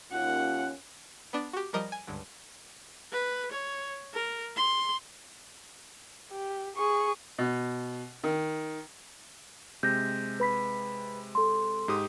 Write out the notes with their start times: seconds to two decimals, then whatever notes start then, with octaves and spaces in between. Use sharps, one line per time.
0.12 D#2 C#4 F4 F#5
1.33 B3 D4
1.53 F#4 G4
1.73 F3 G3 A#4 D#5
1.92 G#5
2.07 C#2 G2 D3
3.12 B4
3.52 C#5
4.14 A#4
4.57 C6
6.32 G4
6.76 G#4 C#6
7.39 B2
8.24 D#3
9.83 C3 G#3 G6 A#6
10.40 B4 B5 B6
11.35 A4 C6
11.88 G#2 G4 D#6